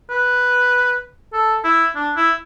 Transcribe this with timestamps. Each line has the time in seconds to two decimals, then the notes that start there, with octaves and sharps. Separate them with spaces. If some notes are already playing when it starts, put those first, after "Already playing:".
0.10 B4
1.33 A4
1.64 E4
1.95 D4
2.16 E4